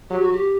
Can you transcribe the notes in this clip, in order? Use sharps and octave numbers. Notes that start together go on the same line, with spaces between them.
F#3 G4
F#4
G4